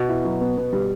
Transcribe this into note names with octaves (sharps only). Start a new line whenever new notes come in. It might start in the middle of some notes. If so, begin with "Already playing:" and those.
Already playing: B2
E4
F#3
B3
B3
G3